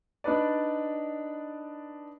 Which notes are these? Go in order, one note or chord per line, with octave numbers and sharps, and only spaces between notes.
D4 D#4 B4 D5